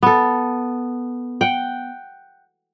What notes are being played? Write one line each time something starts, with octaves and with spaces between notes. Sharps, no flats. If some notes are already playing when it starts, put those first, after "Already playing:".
B3 A4
F#5 G5